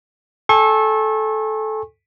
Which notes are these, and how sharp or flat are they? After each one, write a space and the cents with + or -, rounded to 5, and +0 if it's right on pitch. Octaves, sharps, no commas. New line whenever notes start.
A4 -15 G#5 -35 C#6 -35